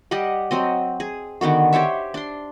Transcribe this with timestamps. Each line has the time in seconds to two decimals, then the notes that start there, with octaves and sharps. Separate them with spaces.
0.11 G3 G4 D#5 F#5
0.51 F#3 C4 D#5
1.00 G#4
1.41 D3 D#3 B3 F#4
1.73 G4 C5 C#5 E5
2.14 D4 C6